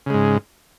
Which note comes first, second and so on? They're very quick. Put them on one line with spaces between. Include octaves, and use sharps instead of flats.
C#3 G#3 G#2